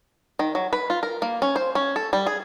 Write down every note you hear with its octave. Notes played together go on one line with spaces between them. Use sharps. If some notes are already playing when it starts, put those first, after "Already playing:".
D#3
F#3
B4
F4
A#4
A#3
C#4
C5
C#4
A4
G3
G#4